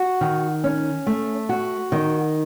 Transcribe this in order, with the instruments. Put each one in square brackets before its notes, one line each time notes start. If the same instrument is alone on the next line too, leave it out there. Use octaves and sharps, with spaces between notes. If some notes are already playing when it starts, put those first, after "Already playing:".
Already playing: [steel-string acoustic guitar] F#4
D#3
C#4
A3
F#4
D#3